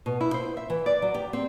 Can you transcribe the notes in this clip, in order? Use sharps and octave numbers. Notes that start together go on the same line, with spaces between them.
B2
E4
C5
E5
E3
D5
F#3
G4
C4